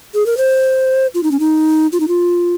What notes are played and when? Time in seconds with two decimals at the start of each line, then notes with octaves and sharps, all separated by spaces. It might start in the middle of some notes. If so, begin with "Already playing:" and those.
0.14 G#4
0.26 A#4
0.37 C5
1.14 F4
1.23 D#4
1.31 C#4
1.40 D#4
1.92 F4
2.00 D#4
2.08 F4